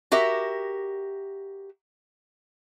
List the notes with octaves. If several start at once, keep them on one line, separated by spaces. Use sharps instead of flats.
F#4 G4 A#4 E5